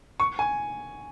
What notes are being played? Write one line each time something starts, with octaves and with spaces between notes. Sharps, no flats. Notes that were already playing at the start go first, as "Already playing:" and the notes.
C#6
G#5